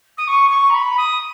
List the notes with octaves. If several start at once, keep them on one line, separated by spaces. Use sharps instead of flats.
D#6
C#6
C#6
A#5
B5
D#6